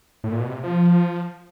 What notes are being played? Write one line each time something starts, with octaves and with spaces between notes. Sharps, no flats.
A2
A#2
B2
C3
F3